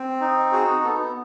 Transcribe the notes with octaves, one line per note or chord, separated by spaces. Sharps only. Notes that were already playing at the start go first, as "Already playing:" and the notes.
Already playing: C4
D#4
F#4 G#4
B3 A4